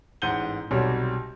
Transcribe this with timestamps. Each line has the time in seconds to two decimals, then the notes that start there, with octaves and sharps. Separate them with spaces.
0.22 A1 G#2 F#5 G6 D#7 G7
0.71 B1 C3 G3 F#4 C#5